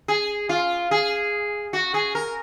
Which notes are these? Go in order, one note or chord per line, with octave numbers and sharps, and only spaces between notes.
G#4
F4
G#4
F#4
G#4
A#4